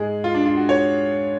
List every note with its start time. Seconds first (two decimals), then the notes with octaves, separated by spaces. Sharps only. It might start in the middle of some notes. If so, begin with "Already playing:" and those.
Already playing: G#2 G#3 G#4
0.24 F4
0.34 D4
0.46 F4
0.57 F#4
0.69 C#5